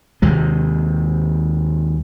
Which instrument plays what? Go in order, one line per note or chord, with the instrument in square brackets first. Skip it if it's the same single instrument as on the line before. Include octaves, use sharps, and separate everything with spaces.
[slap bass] D#2 C3 G#3